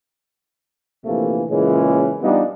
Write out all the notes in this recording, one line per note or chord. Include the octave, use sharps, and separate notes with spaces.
A#1 C3 E3 A3 A#3
A#2 C#3 E3 G#3 C#4
G3 B3 D4 D#4 F4